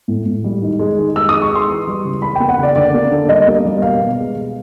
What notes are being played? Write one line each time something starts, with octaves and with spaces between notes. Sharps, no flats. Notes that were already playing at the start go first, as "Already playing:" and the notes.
A2
A2
G3
D#3
G#3
D#3
G#3 E6
D#6
G#3
C#6
G#3 C6
E3
G3
C#3
E3 B5
A#3 G5
F#5
C#3 D5
D3 D5
A#3
D3
G3 D#5
A#3
G3
B2 F5
B2
G#3
B2